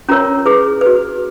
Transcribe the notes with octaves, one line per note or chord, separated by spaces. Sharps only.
C#4 F4 A#4 C#5 A#5
E4 G#4 B4
F#4 B4